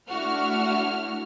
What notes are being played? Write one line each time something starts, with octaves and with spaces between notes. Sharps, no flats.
A3 D4 E4 F#4 F6